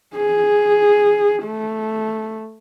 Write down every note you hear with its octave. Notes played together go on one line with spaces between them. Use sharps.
G#4
A3